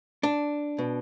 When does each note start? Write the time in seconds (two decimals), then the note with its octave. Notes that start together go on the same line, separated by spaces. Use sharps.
0.23 D4
0.78 B2